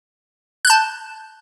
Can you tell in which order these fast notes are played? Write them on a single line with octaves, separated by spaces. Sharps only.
F#6 G6 A5